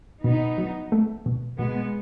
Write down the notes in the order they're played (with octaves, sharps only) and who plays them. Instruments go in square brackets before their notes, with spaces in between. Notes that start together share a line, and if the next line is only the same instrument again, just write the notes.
[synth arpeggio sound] B2 [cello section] B3 D#4
[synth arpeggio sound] F#3
A3
B2
[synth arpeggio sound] B2 [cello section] G#3 B3